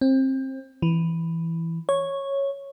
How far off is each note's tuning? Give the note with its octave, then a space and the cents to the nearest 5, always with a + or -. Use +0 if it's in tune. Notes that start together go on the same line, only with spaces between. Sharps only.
C4 +25
E3 +5
C#5 -5